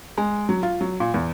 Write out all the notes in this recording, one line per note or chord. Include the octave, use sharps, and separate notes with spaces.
G#3
F#3
F4
F#3
A#2
E2